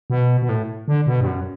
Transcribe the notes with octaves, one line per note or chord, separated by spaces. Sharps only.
B2
B2
A2
D3
B2
G2
F#2